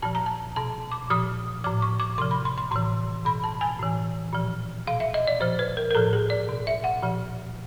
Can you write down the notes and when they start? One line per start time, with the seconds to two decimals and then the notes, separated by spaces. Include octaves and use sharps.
0.02 A#2 F3 A5
0.15 A#5
0.26 A5
0.56 B2 A5
0.92 D6
1.10 A#2 F3 D#6
1.64 A2 F3 D6
1.82 C#6
2.00 D6
2.18 C3 F3 C6
2.31 B5
2.45 C6
2.58 C6
2.71 A2 E3 C6
3.25 B2 B5
3.44 A5
3.61 G#5
3.79 A2 E3
4.33 A#2 F3
4.87 B2 F5
5.00 E5
5.14 D#5
5.28 D5
5.41 A#2 F3 C5
5.59 B4
5.77 A#4
5.91 A#4
5.95 A2 F3 A4
6.13 G#4
6.30 D5
6.49 B2
6.67 E5
6.84 F#5
7.03 A#2 F3